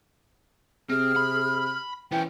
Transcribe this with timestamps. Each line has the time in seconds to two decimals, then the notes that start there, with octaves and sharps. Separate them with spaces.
0.89 C3 C4 G#4 F6
1.16 B5
2.12 E3 B3 C#4 G5